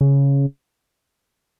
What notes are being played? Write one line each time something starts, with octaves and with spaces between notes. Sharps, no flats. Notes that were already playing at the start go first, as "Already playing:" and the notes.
C#3